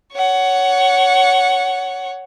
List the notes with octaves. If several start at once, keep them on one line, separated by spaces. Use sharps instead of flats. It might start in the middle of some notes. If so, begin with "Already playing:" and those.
C#5 F#5